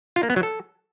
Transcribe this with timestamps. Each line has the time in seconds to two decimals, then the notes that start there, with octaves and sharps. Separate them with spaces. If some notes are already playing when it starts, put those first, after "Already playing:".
0.16 F4
0.23 A#3
0.30 B3
0.36 F#3
0.43 A4